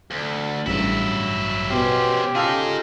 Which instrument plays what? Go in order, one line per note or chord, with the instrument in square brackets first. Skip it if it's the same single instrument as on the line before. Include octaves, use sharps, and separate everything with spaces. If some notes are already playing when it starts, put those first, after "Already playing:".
[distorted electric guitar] D2
[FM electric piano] A1 G2 C#3 [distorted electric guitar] F#3 E4
[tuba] B2 [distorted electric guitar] C#4 C5 [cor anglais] G4
[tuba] C#3 [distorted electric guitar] D#4 G#4 [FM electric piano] F4 A4 F6